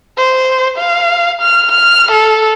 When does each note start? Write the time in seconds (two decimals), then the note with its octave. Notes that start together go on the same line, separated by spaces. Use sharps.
0.18 C5
0.78 F5
1.41 F6
1.72 F6
2.12 A4